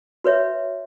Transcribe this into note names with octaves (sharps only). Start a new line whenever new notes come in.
F#4 B4 C#5 E5